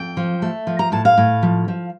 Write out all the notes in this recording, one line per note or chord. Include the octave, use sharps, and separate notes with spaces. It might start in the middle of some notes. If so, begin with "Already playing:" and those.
Already playing: F2 G5
F3
A3
F3
A#5
A2 A5
F5
A2
F3
F3